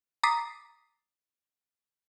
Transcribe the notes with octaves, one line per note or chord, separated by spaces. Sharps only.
A#5 D6 D#6 A6 B6 C7